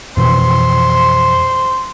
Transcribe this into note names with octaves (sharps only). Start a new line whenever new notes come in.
F2 B2 E3 C5